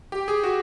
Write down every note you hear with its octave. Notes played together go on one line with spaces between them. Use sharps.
G4
G#4
F#4